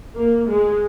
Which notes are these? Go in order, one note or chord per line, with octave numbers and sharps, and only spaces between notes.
A#3
G#3